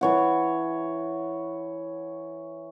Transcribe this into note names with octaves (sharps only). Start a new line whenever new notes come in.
E3 C#5 F#5